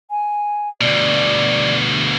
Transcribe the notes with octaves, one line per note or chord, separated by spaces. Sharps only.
G#5
D2 B2 D5